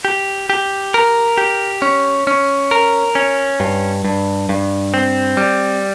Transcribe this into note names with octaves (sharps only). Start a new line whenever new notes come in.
G4
G4
A#4
G4
C#4
C#4
A#4
C#4
G2
G2
G2
C4
G3